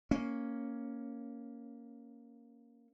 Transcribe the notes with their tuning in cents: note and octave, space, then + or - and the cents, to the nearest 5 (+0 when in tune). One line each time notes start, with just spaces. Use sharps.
A#3 +0 C#4 +0